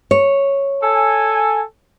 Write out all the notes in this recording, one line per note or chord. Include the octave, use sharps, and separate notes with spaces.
C#5
A4 G#5